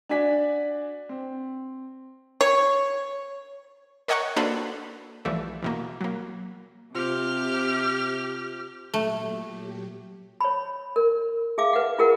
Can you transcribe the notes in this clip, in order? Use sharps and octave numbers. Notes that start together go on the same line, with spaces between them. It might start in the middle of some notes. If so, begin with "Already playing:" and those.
D4 F#4 D5 G#5 B6
C4
C#5
A#4 C#5 D#5 F#5 G5 C#6
A#3 D4 F#4 A4 B4 C5
B1 E3 F3 G3 A3
E2 B2 A#3
F#3 A#3
C3 F4 G4 C5 F6
A#2 F#3 A3 G4
C#5 B5
A#4
G#4 E5 F5 D6
B4 F#5
F4 G#4 A#4 F#5